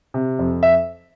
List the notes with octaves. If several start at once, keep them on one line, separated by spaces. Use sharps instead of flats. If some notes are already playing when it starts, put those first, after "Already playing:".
C3
F2
E5